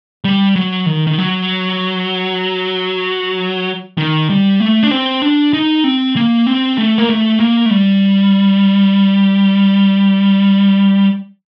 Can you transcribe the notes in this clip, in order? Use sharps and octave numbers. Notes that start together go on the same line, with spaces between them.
G3
F#3
D#3
D#3
F#3
D#3
G3
A3
D4
C4
D4
D#4
C4
A#3
C4
A3
A#3
A3
A#3
A3
G3